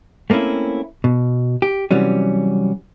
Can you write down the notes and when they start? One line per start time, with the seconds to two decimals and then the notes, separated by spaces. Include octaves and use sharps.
0.30 A3 A#3 C4 C#4 E4
1.04 B2
1.62 G4
1.91 C3 E3 F#3 G3 C#4